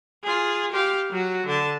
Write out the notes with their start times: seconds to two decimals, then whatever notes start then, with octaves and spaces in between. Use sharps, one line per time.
0.23 F4 G#4
0.71 G4 F5
1.10 F#3 F#4
1.46 D3 A5